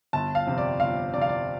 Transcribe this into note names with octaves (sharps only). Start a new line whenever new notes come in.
G1 A5
F5
F2 C3
D5
G1 F5
F2 C3 D5
F5
D5